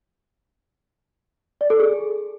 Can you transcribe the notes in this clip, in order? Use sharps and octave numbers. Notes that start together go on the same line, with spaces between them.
D5
A4
G#4